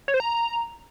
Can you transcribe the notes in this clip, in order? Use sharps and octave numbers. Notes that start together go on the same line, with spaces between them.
C#5
C5
A#5